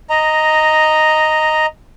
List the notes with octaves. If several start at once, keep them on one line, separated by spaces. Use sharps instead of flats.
D#5 A#5